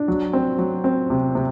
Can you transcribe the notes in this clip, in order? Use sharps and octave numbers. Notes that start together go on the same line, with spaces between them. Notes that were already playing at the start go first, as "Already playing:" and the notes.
Already playing: D4
F#3
C4
F#3
C4
C3
C3